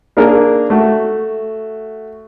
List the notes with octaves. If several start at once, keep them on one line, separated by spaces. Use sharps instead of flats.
A#3 D4 G#4 A#4
A3 F#4